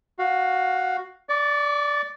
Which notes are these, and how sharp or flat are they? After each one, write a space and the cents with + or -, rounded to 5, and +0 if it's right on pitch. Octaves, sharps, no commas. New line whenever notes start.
F#4 +0 F5 +15
D5 -10 C#6 +40